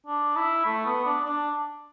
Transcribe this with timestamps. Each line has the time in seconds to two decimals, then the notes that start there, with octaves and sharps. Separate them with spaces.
0.07 D4
0.36 E4
0.65 A3
0.86 B3
1.05 D4
1.25 D4